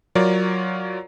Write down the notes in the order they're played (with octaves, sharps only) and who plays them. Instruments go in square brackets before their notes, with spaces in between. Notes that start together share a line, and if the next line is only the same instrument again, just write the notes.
[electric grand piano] F#3 F4 A#4 C#5 D5